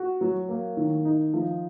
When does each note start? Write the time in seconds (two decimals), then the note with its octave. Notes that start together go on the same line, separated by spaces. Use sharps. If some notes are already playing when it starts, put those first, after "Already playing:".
Already playing: F#4
0.21 F#3
0.49 A#3
0.77 D#3
1.05 D#4
1.34 F3